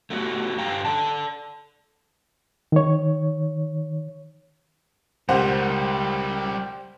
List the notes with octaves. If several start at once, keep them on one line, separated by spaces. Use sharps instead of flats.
A3 B3 F#4 G4
G2 G4 F5 G5 A#5
A4 D5 A5
D#3 C#5
C#2 G3 G4 A#4 C5 F#5